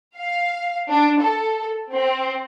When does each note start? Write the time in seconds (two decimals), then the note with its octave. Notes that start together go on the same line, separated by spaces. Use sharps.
0.17 F5
0.90 D4
1.20 A4
1.92 C4